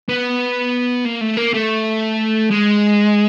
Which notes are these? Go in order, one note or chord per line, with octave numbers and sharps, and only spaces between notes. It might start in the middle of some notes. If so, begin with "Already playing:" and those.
B3
A#3
A3
A#3
A3
G#3